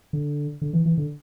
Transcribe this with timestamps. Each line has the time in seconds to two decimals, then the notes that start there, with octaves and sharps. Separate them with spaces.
0.13 D3
0.62 D3
0.73 E3
0.86 E3
0.97 D3